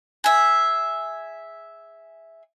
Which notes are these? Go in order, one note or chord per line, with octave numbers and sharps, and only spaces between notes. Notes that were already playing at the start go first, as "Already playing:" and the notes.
G#4 E5